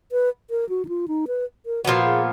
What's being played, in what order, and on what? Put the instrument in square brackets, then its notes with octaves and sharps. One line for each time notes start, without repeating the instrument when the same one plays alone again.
[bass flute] B4
A#4
F#4
D#4
F4
D#4
B4
A#4
[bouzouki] A#2 F3 B3 [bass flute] F#4
[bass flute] G#4